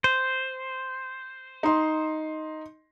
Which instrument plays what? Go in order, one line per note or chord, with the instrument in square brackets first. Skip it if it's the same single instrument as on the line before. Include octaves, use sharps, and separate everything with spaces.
[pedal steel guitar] C5
[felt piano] D#4 C6